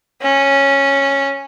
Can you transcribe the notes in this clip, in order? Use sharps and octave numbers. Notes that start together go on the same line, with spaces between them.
C#4